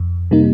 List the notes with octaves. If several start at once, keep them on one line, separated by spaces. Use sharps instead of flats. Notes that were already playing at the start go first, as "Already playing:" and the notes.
Already playing: F2
C3 G3 A#3 D#4